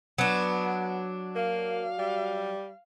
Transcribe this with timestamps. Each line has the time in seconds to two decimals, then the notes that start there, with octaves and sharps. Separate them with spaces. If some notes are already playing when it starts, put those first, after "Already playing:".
0.18 F#3 B3 D4
1.35 A#3 F5
1.99 G3